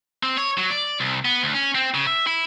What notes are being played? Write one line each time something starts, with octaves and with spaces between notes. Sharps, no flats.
C4
C#5
F#3
D5
C2
B3
D2
C#4
C4
C#3
E5
E4